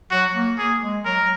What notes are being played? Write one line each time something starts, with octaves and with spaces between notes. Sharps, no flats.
F#3 F#4
A#3
A#3 G#4
G#3
F#3 A#4